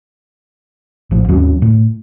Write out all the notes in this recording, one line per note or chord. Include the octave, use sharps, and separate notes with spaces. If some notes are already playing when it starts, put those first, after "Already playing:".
A#1 A2 F3
D#2 G#2 F#3 C#4
A2